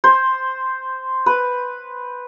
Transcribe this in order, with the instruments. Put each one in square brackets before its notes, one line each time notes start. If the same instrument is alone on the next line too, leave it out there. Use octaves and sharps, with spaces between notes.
[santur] C5
B4